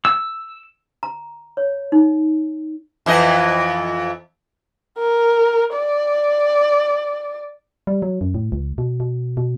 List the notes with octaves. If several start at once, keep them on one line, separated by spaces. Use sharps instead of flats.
E6
A#5
C#5
D#4
F2 E3 D#5
A#4
D5
G3
F#3
F#2
A2
C#2
B2
B2
B2